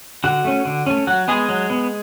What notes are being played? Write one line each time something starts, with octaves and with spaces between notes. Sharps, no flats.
D3 F#4
A3 C#4
D3
A3 C#4
F#3 F#4
G#3 B3 G#4
F#3
B3